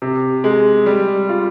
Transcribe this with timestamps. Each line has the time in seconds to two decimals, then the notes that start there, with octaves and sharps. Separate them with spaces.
0.02 C3
0.44 G#3
0.86 G3
1.29 F4